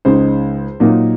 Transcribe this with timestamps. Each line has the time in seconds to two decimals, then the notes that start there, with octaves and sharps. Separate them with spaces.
0.05 C#2 C#3 G#3 D#4 C5
0.80 A#2 F#3 A#3 D#4